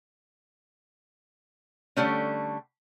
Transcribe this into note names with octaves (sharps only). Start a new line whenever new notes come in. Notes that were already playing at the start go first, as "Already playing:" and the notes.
D3 G3 A3 C#4